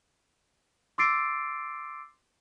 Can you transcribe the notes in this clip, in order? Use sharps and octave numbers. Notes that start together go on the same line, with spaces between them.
C6 D6 E6 A6 C7 D7